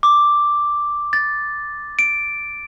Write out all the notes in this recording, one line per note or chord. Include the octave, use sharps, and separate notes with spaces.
D6
A6
D7